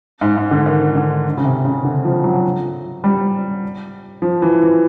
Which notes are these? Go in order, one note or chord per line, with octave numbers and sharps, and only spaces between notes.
G#2
G#2
D3
D#3
D3
C#3
C3
C#3
D3
F3
F#3
G3
F3
E3
E3